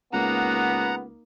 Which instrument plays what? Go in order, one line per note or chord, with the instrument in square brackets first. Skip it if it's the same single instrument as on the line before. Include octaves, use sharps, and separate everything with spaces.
[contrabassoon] C#2 [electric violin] A#3 D#4 [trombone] B3 [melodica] F#5 A#5